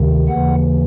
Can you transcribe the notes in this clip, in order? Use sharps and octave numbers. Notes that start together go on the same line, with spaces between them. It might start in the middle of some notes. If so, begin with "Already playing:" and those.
Already playing: D2 C3 D#3
D#2 C#3 E3 F#5